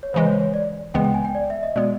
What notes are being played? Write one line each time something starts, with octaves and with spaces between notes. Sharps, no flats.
C#5
C#3 E3 G#3 C5
C#5
C#5
D5
C#2 C#3 E3 G#3 B3 G5
G5
G#5
G5
D5
E5
D#5
B2 G#3 B3 D5